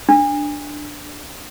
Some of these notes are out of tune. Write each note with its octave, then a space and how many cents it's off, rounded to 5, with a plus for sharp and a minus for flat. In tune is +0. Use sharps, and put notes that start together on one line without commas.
D4 +5